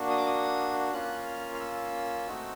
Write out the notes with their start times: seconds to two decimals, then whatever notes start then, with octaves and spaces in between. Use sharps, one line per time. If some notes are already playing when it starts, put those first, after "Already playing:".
Already playing: A#3 D4 F#4
0.10 D#6
0.17 D6
0.26 D#6
0.93 A#3 C#4 F4 F#6
1.26 F6
1.54 F6
1.60 E6
2.27 A3 C4 D#4 F#4